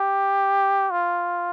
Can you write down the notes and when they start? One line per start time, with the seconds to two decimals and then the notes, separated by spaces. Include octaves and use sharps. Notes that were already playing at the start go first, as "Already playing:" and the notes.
Already playing: G4
0.90 F4